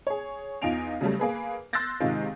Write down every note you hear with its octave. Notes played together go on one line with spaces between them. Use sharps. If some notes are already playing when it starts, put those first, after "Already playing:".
G#4 C#5
E2 D#4 F4 G#5 D7 F7
C#3 F#3 G3 A3
A#3 G#4 B4
C6 E6 F#6 G6 A6 A#6
G#2 C3 D#3 G#3 F4